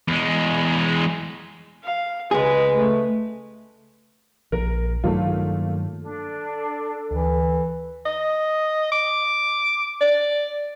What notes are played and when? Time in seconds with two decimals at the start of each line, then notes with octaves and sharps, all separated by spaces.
0.08 E2 G#3
1.84 F5
2.31 C#2 G#3 G#4 B4
2.71 A3
4.52 A#1 A#4
5.04 G2 D#3 F#3 A3 A#3 F4
6.02 D4 A4
7.11 D2 E3
8.06 D#5
8.92 D6
10.01 D5